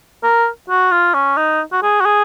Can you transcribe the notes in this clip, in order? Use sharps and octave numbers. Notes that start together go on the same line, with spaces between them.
A#4
F#4
F4
C#4
D#4
F#4
G#4
F#4
G#4